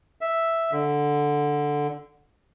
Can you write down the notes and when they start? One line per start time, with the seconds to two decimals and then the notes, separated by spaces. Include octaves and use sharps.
0.21 E5
0.72 D3